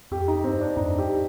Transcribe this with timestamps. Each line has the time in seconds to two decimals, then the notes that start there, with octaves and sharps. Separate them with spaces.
0.11 F2 G4
0.28 D#4
0.44 G2 C4
0.61 D4
0.77 F2 D#4
0.99 G4